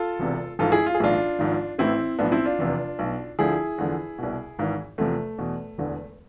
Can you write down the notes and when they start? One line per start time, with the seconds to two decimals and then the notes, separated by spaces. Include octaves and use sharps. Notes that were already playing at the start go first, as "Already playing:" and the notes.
Already playing: F4 A4
0.19 E1 E2 C3
0.59 A1 G#2 F3 F4 A4
0.72 E4 G#4
0.86 F4
0.95 G#4
1.00 B1 A2 E3 D4 F4
1.39 G#1 G#2 F3
1.78 A1 A2 E3 C4 E4
2.19 B1 A2 F3 B3 D4
2.32 C4 E4
2.45 D4 F4
2.59 F1 E2 C3
2.99 B1 B2
3.39 D2 D3 F3 E4 G#4
3.78 E2 D3 F3
4.19 C2 B2
4.59 G#1 G#2 E3
4.98 E2 C3 F3 A3
5.38 E2 B2
5.78 E1 E2 D3